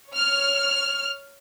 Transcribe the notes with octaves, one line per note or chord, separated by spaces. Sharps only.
C#5 F6